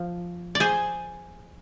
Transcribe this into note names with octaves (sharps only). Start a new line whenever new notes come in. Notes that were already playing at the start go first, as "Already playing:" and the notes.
Already playing: F3
D5
G#4 C5